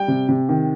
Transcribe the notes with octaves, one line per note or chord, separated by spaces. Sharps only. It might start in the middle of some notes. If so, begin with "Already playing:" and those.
Already playing: G3 G5
C3
C3
D#3